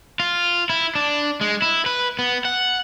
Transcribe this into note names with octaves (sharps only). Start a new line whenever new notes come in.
F4
E4
D4
G#3
E4
B4
B3
F#5